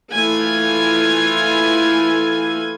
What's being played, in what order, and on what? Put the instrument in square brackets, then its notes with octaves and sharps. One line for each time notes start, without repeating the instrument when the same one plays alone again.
[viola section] E3 A3 E4 F4 G#5